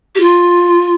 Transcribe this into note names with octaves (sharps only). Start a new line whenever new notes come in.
G4
F4